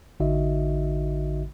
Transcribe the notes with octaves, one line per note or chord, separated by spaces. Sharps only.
A1 D3 D#4 F#4 D#5 E5